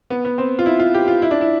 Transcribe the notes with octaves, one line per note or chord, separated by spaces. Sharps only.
B3
B3
C4
F4
E4
F4
G4
F4
E4
D4
E4